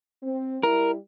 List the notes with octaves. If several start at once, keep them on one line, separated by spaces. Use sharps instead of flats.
C4
G3 E4 A#4